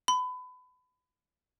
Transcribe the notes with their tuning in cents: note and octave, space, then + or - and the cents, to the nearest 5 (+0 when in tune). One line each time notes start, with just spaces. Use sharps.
B5 +25